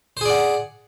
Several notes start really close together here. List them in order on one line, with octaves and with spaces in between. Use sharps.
C5 G#4 D5 F#5